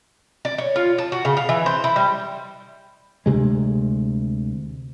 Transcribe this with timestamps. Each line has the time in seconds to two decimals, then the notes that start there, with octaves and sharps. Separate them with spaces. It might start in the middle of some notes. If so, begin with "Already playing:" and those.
0.45 D5
0.58 C#5
0.76 F4
0.98 A5
1.12 F#4
1.25 C#3
1.37 F5
1.49 E3
1.66 C5
1.84 E4
1.96 G3
3.26 D2 C3 G#3